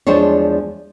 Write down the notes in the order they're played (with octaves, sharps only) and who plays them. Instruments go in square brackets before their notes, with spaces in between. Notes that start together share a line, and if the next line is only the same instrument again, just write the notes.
[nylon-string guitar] E2 F3 G#3 D4 C5 C#5